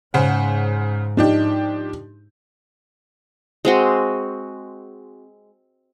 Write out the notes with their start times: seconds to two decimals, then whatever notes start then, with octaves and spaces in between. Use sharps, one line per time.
0.14 G#2 C#3 C5 F#5
1.17 F3 D4 D#4 G4
3.65 G#3 C4 F#4